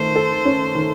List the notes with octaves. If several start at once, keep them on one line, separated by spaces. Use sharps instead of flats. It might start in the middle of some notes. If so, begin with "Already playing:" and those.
Already playing: D#3 A3 C5
A4
C#4
D#3